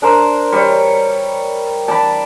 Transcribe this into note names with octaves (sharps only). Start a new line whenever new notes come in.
D4 A#4 C5
G3 C#5
D5 A5 B5